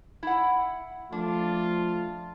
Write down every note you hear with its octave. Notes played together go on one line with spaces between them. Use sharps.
E4 F#5
F3 A3 D4 F4